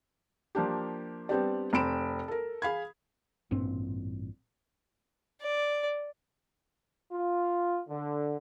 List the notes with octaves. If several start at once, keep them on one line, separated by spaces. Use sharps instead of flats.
F3 A#3 D4 G4
G3 B3 C4 D4 G4 D5
F1 C4 B5 D7 E7
A4 A#4
G#4 F5 B5 G#6
A1 G2 A#2 C4
D5
F4
D3